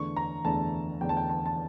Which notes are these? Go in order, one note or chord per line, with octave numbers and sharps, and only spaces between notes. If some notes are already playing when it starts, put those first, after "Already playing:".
Already playing: E2 D3 A3 C#6
A#5
E2 D3 A3 A5
E2 D3 A3 G5
A5
G5
A5
A5